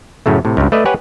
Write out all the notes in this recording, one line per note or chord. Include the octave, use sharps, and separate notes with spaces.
F#2 A2 C#3 A3
A2 C3
C#2 G2
A3 B4 D5 D#5
G4 B4 C#5 F#5 G#5